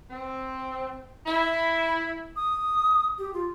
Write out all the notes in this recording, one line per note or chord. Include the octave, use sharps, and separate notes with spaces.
C4
E4
D#6
G4
F4